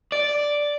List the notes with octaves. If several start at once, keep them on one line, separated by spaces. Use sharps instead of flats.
D5